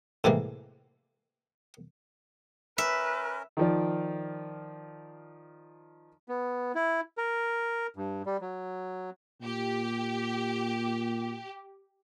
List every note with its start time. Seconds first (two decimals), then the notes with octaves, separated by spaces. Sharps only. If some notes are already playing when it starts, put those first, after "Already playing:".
0.24 A2 C3 E3 G#3 A#3
2.78 C#4 A#4 B4 E5
3.57 D#3 F3 D5
6.28 B3
6.75 E4
7.18 A#4
7.96 G2
8.26 G3
8.41 F#3
9.42 A#2 G4